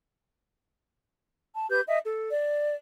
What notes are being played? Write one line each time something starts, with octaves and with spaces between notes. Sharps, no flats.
A5
G4 B4 G6
D#5 E5
A4
D5